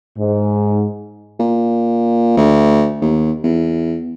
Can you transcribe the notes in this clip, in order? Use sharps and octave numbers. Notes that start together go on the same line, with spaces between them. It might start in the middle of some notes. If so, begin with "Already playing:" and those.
G#2
A#2
D2
D#2
E2